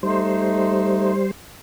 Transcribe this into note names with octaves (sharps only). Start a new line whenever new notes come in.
G3 A3 D#4 C5